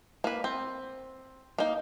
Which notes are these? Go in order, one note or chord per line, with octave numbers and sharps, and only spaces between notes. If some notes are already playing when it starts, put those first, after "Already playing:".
A#3 B4
C4
A#3 D#4